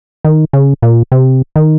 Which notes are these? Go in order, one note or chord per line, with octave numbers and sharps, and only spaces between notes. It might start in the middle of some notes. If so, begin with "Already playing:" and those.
D#3
C#3
A#2
C3
D#3